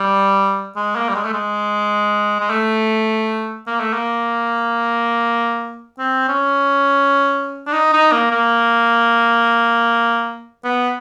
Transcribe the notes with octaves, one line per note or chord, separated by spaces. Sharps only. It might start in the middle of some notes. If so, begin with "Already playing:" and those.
Already playing: G3
G#3
A#3
G3
G#3
A3
G#3
G#3
A3
A#3
A3
A#3
C4
C#4
D4
D#4
D#4
A#3
A#3
B3